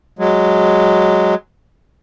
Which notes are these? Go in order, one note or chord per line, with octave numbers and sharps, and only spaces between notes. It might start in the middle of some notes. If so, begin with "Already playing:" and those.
F#3 G#3